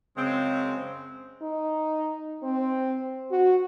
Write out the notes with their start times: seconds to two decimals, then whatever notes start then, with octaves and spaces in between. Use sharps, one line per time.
0.17 F#2 C#3 G#3 C4
1.42 D#4
2.43 C4
3.31 F#4